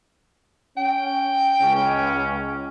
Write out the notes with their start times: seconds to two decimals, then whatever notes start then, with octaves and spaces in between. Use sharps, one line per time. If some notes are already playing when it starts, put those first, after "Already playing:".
0.77 C#4 G5
1.61 C#2 C#4